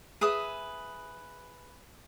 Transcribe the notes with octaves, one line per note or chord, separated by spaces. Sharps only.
G#4 B4 E5 D#6